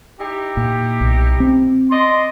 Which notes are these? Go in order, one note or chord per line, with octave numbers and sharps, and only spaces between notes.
D#4 E4 G4
A#2
B1
C4
D5 D#5 C6